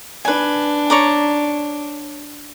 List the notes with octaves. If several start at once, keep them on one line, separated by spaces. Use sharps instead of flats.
D4 B4 G#5
C#5 D5 A#5